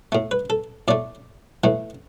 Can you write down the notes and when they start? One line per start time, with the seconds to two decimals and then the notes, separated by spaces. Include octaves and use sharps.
0.12 A2 A3
0.31 B4
0.50 A4
0.88 A2 A3 D5
1.64 A2 E3 A3